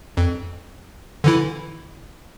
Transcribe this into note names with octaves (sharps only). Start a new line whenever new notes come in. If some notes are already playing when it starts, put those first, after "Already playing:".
F2
D3 E3 E4